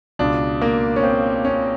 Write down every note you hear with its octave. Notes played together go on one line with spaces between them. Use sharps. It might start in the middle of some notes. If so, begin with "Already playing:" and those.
C#2 B2 D4
A#3
C#4
C4
C#4